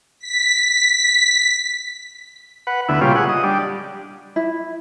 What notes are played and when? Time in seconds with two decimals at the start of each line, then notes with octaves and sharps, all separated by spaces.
0.19 B6
2.67 B4 F#5
2.88 D2 B3 E4
3.01 A#2 C#3 G3 F4
3.15 G#4 F#5
3.29 D#5
3.43 G3 D4
4.36 E4